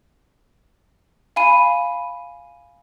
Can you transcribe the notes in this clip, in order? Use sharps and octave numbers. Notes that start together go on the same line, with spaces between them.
F5 G#5 B5 D#7